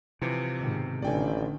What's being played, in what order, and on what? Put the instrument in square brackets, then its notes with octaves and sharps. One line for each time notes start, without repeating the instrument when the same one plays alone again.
[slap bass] C3 [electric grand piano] E3 F3
[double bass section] G#2 B2 D#3
[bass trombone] A1 [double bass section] D3 D#3 [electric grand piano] D5 G5 G#5